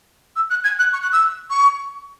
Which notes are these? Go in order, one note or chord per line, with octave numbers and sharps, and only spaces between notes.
E6
F#6
G#6
F#6
C#6
F#6
E6
C#6